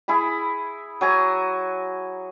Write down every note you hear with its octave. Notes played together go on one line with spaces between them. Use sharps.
E4 G#4 B5
F#3 G#5 A#5